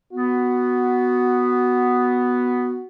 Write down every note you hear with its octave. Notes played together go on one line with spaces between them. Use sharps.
B3 F#4